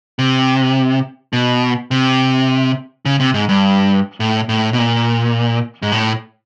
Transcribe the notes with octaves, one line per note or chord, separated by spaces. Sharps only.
C3
B2
C3
C#3
C3
G#2
G2
A2
A2
B2
A#2
G#2
A2